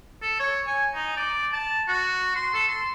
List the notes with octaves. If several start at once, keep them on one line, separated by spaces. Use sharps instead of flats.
A4
C#5
G#5
D#4
D5
A5
F#4
C6
A4
C6